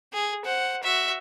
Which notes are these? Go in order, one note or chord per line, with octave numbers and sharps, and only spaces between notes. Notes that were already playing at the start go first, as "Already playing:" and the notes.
G#4
C5 F#5
F#4 E5